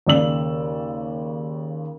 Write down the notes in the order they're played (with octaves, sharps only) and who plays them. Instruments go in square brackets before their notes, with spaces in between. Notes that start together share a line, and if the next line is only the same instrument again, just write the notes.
[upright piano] D#2 C#3 D5 E6 F#7